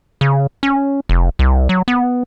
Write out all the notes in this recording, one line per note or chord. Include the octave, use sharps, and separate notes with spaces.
C#3
C#4
F1
C2
F#3
B3